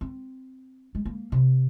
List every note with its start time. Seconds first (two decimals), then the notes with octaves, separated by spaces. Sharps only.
0.01 C4
0.95 G#3
1.05 A#3
1.32 C3